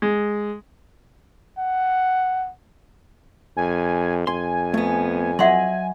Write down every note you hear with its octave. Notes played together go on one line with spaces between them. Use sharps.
G#3
F#5
F2 G#5
F2 G#5 C6
A3 B3
F#3 D#5 E5 F#5 C6